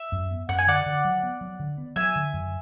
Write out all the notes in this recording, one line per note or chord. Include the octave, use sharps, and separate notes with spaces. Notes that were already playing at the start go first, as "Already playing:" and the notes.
Already playing: E5
F#2
B3
F#2 F#5
G#5
D3 D5 F#5
D3
F#3
B3
F#3
D3
B3
F#3 E5 G#5
D3
F#2